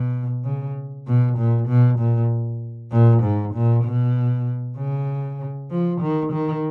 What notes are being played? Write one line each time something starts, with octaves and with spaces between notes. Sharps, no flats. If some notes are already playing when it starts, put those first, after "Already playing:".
Already playing: B2
C#3
B2
A#2
B2
A#2
A#2
G#2
A#2
B2
C#3
F3
D#3
D#3